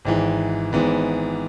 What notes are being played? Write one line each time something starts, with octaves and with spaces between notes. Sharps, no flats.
G#1 G#2 E3
G#1 G#2 E3 B3